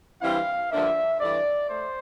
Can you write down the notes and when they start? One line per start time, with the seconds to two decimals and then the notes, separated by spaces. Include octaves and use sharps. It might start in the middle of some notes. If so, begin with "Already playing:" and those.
0.22 G2 E3 G3 C4 E4 F5
0.71 G2 D3 F3 A#3 D4 E5
1.20 G2 E3 A3 D5
1.70 A3 C5